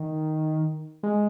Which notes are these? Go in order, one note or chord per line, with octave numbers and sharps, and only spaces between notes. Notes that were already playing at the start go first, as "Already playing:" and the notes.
Already playing: D#3
G#3